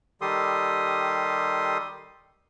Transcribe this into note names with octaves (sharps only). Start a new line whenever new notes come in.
D#3 G3 G4 A4 C6 D#6